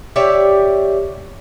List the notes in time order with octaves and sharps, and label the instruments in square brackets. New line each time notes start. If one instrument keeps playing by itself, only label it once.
[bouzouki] G4 C#5 D5 E5